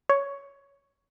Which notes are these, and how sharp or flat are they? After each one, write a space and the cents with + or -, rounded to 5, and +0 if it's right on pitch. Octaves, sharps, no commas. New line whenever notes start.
C#5 +10